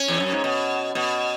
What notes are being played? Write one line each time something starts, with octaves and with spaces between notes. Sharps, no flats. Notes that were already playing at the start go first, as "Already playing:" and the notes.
Already playing: C#4
E2
F#2
G#2
B2
B2